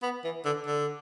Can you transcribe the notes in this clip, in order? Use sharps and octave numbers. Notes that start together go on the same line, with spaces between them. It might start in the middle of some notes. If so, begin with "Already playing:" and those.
B3
E3
D3
D3